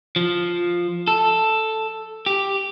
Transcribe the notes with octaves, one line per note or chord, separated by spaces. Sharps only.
F3
A4
G4